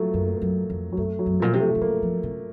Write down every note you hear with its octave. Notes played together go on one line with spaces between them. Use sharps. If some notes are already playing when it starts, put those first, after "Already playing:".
Already playing: F3 F#3 A3
F#2 A#3
A3
F#2 A#3
F2
F#3
F#2 A3
F#3
F#2
A#2 F3
C3
A3
C3
C#3 A#3
F3
C#3